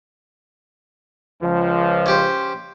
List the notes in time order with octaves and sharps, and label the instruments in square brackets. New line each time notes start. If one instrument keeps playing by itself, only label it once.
[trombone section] C#2 F3
[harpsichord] C#4 G4 C5